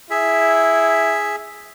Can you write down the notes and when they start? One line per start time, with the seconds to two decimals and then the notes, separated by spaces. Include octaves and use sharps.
0.10 E4 G#4 E5